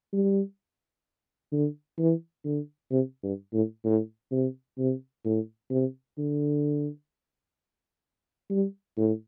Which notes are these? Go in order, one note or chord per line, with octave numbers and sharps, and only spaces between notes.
G3
D3
E3
D3
C3
G2
A2
A2
C3
C3
A2
C3
D3
G3
A2